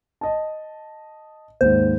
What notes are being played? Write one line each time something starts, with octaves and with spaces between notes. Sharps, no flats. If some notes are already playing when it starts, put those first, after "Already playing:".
D#5 A5
D#2 G#2 C5